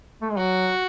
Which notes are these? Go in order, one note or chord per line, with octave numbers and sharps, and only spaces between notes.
A3
G#3
F#3 F#4